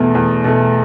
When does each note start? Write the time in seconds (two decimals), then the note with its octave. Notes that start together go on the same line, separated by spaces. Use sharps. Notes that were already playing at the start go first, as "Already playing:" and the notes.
Already playing: E2 B2 A3
0.15 E2
0.44 B2 A3